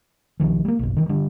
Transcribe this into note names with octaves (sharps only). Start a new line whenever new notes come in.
B1 E2 D#3 F3
G3 A#3
F#1 B1
D#3 E3
D3 G3 D4